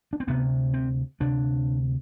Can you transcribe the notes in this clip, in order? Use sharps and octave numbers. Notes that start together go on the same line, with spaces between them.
D4
C4
D2 C3 B3
C4
D2 C3 D4